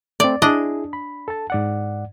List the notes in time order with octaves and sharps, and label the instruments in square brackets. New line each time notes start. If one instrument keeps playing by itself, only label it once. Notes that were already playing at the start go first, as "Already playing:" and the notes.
[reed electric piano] A3 C4 [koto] D5
[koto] D4 D#5 [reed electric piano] E4 G#4
[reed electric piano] B5
A4 A5
G#2 D5 F#5